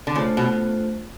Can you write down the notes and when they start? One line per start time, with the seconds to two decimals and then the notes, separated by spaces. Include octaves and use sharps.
0.07 D3
0.15 C#3 A3 D4 F4 A4 C5
0.37 B2